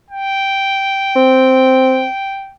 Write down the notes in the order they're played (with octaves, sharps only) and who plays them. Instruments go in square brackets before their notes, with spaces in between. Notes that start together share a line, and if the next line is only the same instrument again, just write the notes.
[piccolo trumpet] G5
[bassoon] C4